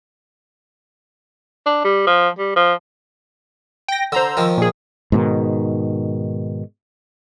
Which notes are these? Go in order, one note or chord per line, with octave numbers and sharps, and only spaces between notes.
D4
G3
F3
G3
F3
G5 A#6
D3 C5 A#5 E6
D#3 F3
A#2 G#4
G#2 B2 D#3